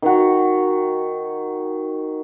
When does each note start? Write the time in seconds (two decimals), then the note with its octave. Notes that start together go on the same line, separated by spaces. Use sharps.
0.02 D#3 F#4